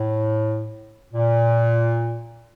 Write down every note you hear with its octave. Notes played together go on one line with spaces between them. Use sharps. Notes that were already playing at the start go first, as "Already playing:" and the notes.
Already playing: A2
A#2